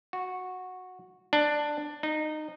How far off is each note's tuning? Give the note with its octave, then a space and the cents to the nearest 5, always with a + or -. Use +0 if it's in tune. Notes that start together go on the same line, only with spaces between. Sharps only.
F#4 -10
D4 +10
D#4 -20